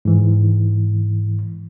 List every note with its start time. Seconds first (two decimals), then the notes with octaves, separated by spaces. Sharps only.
0.05 G#2 E3